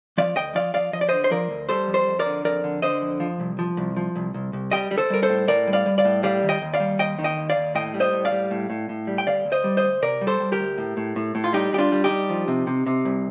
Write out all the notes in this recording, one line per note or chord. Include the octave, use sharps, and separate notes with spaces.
F3 D5 F5
D2 D#5 G5
F3 D5 F5
F3 D5 F5
F3 D#5
D5
D3 C5 D#5
C5
F3 A#4 D5
D2
G3 A4 C5
F2
A4 C5
F2
A#4 D5
D3
F2 A#4 D5
D3
D3 C5 D#5
F2
F3
C2
F3
C2
F3
C2
C2
C2
G3 D#5 G5
G3
A4 C5
G3 A#4
A4 C5
A2
A2 A#4 D5
G3
D5 F5
G3
D5 F5
A2
G3 D5 F5
D#3
D#5 G5
D#2
D5 F5
G3
D#2 D#5 G5
D#3
D#5 G5
D#2
D5 F5
D#2
A2 D#5 G5
G3
C5 D#5
A2
D5 F5
G3
A2
A2
A2
G3
G5
D2 D5 F5
D2
C5 D#5
G3
C5 D#5
D2
C3 A#4 D5
G3
A4 C5
G3
G4 A#4
D2
A2
A2
A2
A2
F4
G3 D#4 G4
G3 G4
D4 F4
G3
D#4 G4
G3
F3
C3
C3
C3
C2